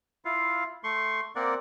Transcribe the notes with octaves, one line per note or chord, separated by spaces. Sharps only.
E4 F4 F5
A3 C6 C#6
A#3 C4 A#4 D5 F#5